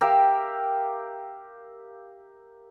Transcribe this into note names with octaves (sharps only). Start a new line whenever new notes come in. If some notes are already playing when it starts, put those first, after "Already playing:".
G4 A#4 E5 F5